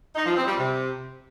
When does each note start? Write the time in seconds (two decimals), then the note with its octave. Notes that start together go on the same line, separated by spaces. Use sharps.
0.15 D#4
0.26 F3
0.36 C4
0.47 G3
0.57 C3